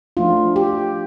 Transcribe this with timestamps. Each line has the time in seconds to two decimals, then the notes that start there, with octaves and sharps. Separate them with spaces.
0.17 F3 A3 D4 F4
0.56 G4